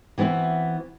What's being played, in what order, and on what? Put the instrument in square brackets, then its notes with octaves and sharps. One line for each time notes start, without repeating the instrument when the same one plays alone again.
[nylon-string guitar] E3 B3 C4 E4 F#4